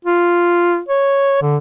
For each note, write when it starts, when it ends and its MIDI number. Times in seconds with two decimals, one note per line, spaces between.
0.05 0.80 65
0.89 1.37 73
1.42 1.57 50